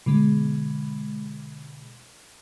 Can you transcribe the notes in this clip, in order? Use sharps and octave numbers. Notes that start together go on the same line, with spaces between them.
B2 D3 G#3